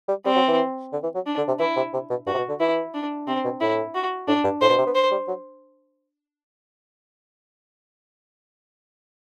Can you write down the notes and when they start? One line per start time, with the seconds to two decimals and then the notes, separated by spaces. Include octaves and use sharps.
0.09 G3
0.25 G3 C4
0.36 F#3
0.48 E3
0.92 D3
1.03 E3
1.15 F#3
1.26 D4
1.38 D3
1.48 C3
1.59 E3 E4
1.76 C3
1.94 C3
2.10 B2
2.26 G2 F#4
2.34 C3
2.38 B2
2.49 D3
2.60 E3 E4
2.94 D4
3.27 C3 C4
3.44 B2
3.61 A2 E4
3.95 F#4
4.28 A2 D4
4.44 G2
4.61 A2 C5
4.70 B2
4.78 C3
4.87 B3
4.95 C5
5.11 G3
5.28 F#3